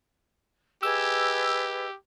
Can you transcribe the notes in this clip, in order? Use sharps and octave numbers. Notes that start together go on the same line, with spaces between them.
G4 G#4 B4 D#5 E6